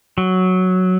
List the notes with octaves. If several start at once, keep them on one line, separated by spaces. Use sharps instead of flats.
F#3